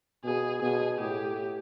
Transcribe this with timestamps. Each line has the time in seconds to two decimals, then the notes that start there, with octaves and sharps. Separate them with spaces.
0.24 B2 G#4
0.62 B2 G#4
1.00 A2 G4